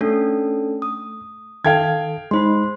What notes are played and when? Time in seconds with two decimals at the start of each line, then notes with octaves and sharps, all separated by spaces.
0.01 A3 C#4 D4 A4
0.82 D#6
1.65 D#3 A4 F5 G5 G#6
2.31 G#3 D#4 C5 B5 C6